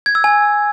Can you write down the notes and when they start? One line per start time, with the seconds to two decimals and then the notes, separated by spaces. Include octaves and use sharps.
0.06 G#6
0.15 E6
0.24 G#5